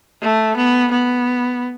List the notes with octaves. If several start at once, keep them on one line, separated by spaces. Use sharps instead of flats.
A3
B3
B3